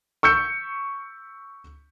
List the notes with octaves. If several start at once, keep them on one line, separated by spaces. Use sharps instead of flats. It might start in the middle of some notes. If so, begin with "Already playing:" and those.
C#6 E6 G6 C#7